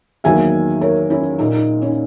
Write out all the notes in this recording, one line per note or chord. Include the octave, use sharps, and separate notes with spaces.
E2 D#3 F#3 A#3 E5 G#5
A#4 C#5
C#4 E4
A#2 A#3 D#4
D#4
C#4 E4